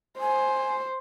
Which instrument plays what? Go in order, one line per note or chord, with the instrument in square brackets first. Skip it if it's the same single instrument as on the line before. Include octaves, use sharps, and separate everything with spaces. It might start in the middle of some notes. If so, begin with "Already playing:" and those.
[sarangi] C5 [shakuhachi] G#5